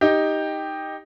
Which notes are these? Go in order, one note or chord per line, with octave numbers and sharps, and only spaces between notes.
D#4 G4